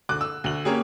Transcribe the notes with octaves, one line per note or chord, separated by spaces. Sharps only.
D2 D6 F#6
E6
D2 F#7
A#3 C#4 G4 G#4